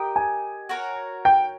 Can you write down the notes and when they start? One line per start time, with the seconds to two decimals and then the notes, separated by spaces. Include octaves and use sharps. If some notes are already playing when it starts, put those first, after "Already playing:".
Already playing: G4 A#4 D#5 G5
0.16 G#5
0.69 F#4 A#4 C#5
1.25 G5